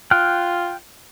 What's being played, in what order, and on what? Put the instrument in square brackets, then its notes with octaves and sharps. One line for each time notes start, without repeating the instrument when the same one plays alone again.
[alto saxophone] F4 [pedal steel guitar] G5 F6 F#6